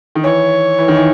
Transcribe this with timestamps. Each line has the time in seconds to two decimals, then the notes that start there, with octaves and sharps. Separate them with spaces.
0.15 D#3
0.23 E3 C#5
0.79 E3
0.88 D#3
0.97 E3